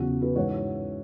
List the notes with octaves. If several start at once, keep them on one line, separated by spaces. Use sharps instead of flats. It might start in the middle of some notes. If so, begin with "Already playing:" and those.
Already playing: E2 C#3 F#3 F#4
F#4 B4
G#2 E3 C#5 F#5